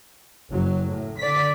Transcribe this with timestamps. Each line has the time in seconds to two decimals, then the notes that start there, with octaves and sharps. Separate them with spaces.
0.50 F#1 F#3
0.84 A2
1.18 D3 D5 B6